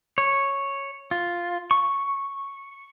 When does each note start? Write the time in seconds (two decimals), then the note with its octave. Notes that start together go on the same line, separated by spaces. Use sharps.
0.18 C#5
1.11 F4
1.71 C#6